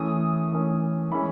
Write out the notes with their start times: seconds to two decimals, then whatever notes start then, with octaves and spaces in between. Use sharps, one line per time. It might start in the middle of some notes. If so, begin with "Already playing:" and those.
Already playing: E3 A3 C#4 D#6
0.52 E3 A3 C#4
1.12 E3 G#3 C#4 B5